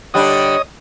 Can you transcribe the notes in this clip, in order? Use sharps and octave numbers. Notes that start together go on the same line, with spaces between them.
D3 G3 D4 C#5 D#5 D#6